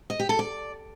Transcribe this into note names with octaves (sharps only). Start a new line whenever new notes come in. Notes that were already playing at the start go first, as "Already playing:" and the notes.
D#5
G4
A4
D5